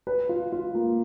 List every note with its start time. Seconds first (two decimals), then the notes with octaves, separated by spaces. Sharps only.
0.07 B4
0.29 F4
0.52 F4
0.75 A#3